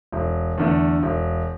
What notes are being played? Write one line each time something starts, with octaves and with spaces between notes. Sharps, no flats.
E1
E2 D3 A3
E1